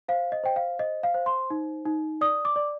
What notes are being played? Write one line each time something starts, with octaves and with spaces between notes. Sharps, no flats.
C5 F5
D#5
C5 G5
F5
C5 D#5
F5
C5
C6
D#4
D#4
D5 D#6
D6
D5